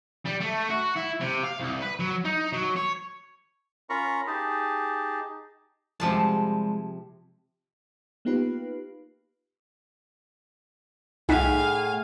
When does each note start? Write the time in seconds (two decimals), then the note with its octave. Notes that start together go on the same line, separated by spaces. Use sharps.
0.26 G3
0.41 A3
0.70 F#4
0.97 E4
1.21 C3
1.44 F5
1.60 C2
1.81 B4
2.00 F#3
2.25 D#4
2.53 F#3
2.76 C#5
3.90 C#4 F4 A#4 A#5 B5 C#6
4.27 D#4 G4 G#4 A5
6.00 C3 F3 G3 G#3 A5
8.25 A#3 B3 D#4 F4 G4 B4
11.29 C2 A2 D#4 G#4 F5 F#5 G#5 B6